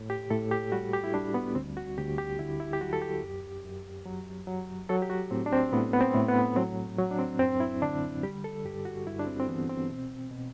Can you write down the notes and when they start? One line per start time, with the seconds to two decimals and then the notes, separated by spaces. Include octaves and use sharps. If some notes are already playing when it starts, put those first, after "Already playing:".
Already playing: A2
0.10 G4
0.30 A2 A4
0.51 G4
0.72 G3 F#4
0.93 G4
1.04 E4
1.14 G3 D4
1.34 B3
1.55 D2 C4
1.77 F#4
1.98 D2 G4
2.18 G4
2.39 D3 E4
2.60 E4
2.73 G4
2.81 F#3 F#4
2.93 A4
3.02 G4
3.22 F#2
3.64 F#2
4.06 F#3
4.47 F#3
4.89 F#3 A4
5.02 G4
5.10 F#4
5.31 A2 C4
5.46 D4
5.53 C4
5.73 A2 B3
5.93 B3
6.01 C4
6.14 A2
6.28 B3
6.56 F#3 C4
6.99 F#3
7.11 D4
7.19 C4
7.39 F#2 C4
7.60 E4
7.82 D3 D4
8.23 G3 G4
8.44 A4
8.65 G2 G4
8.85 F#4
9.07 G2 E4
9.19 D4
9.27 C4
9.40 C4
9.48 E3 B3
9.70 C4
9.90 B2
10.31 B2